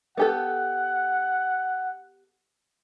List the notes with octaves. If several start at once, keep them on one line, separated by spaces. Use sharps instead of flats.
B3 G4 A4 F#5